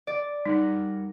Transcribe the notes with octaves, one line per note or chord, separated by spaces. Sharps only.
D5
G3 D#4 A#4 F#5